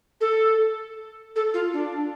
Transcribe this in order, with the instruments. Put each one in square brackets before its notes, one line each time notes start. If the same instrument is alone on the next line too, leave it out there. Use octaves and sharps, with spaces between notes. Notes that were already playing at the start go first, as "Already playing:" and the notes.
[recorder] A4
A4
F4
D4